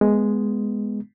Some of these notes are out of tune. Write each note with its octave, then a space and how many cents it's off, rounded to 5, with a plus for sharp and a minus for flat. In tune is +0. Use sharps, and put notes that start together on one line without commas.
G#3 +0 B3 +0